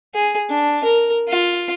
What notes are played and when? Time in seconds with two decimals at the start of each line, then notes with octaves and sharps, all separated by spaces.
0.14 G#4
0.50 D4
0.84 A#4
1.29 F4